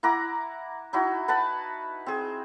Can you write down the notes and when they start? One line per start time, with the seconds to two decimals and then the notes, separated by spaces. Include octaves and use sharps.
0.03 E4 F#5 A#5 D6
0.93 D#4 E4 F#4
1.28 B4 F#5 A5 B5
2.06 C4 G#4